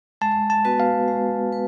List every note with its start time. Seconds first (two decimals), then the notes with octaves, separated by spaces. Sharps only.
0.21 G#3 A5
0.50 A5
0.65 B3 F#4 B4
0.80 F5
1.08 G#3
1.53 B4